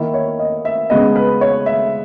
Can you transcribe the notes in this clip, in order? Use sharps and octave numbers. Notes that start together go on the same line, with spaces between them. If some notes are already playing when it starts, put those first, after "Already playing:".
Already playing: D#3 A#3 E4
C#5
D#5
E5
C#3 G#3 B3 D#5
B4
C#5
E5